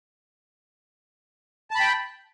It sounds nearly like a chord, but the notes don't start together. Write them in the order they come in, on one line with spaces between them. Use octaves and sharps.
A5 B5 G5